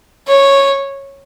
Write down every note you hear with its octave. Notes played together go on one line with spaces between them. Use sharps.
C#5